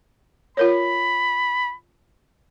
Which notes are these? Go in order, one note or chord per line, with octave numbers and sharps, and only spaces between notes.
F4 A#4 C#5 B5